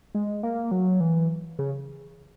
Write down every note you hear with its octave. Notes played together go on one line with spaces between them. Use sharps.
G#3
A#3
F#3
E3
C#3